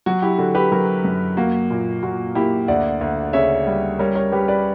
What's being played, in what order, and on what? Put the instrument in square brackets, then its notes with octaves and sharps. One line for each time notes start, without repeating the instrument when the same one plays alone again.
[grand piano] F#3 F#4
E4 G4
D3 F#4
G4 B4
F#3 F#4 A#4
F#2
A#3 F#4
A#2
A#2 F#4
A#3 E4 G4
D2 D5 F#5
D2
C#3 C#5 E5
G3
G3 A#4 C#5
A#4 C#5
G3 G4 B4
B4 D5